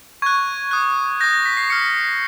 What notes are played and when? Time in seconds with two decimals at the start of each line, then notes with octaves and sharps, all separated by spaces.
0.22 C#6 F#6 G#6
0.71 D#6 F#6
1.20 D#6 G6 A#6
1.33 A#6
1.45 B6
1.57 C7
1.70 D6 F6 C#7